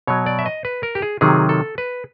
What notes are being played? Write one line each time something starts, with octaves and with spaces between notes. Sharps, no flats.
B2 F#3 C#5
D5
E5
D#5
B4
A#4
G4
G#4
C3 D#3 F#3 G#4
A4
B4